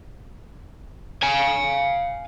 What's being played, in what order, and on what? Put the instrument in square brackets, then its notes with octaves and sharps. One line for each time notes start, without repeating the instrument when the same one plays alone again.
[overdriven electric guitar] F5 G#5